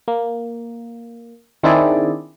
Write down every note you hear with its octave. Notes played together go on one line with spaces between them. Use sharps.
A#3
D#3 C4 D4 E4 G#4 D5